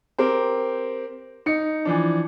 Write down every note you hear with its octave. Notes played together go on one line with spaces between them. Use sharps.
C4 G4 A#4
D#4 C#7
E3 F3 D4